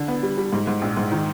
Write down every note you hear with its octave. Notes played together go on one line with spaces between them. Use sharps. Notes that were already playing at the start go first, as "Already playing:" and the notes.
Already playing: D3
B3
G3
G3
G#2
G#2
A#1
G#2
D#3